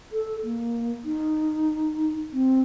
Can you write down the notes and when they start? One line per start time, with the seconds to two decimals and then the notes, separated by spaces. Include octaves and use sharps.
0.13 A4
0.44 A#3
1.05 D#4
2.33 C4